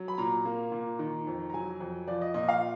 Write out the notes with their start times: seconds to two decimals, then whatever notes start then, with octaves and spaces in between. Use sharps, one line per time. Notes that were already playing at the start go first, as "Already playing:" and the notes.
Already playing: F#3
0.08 B5
0.18 A#2 A#5
0.45 A#3
0.72 A#2
0.99 D#3
1.27 F2
1.50 A#5
1.54 F#3 G#5
1.80 F2
2.08 F3 D5
2.21 D#5
2.34 A#2 D#5
2.49 F5